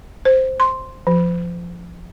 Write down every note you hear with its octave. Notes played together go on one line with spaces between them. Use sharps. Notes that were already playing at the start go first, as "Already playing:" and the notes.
C5
C6
F3